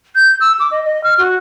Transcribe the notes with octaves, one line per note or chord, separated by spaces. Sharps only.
G6
E6
D6
D#5
D#5
F6
F#4